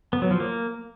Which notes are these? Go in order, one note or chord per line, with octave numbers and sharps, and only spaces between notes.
B3
F#3
F3
A#3